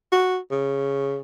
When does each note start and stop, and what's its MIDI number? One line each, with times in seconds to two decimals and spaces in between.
0.12 0.37 66
0.51 1.21 49